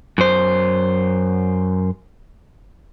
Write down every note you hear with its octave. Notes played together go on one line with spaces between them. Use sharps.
F#2 C5